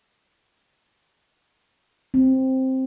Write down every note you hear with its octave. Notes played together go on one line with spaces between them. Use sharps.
C4